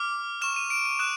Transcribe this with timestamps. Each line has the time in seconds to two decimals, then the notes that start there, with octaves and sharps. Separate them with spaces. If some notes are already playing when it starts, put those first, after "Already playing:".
Already playing: D6 F6
0.41 C#6 F6 E7
0.56 D#7
0.70 D7
0.85 D#7
0.99 D#6 F#6 E7